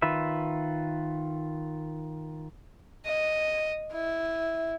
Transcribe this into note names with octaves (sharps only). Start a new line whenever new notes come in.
D#3 F4 B4 E5
D#5
E4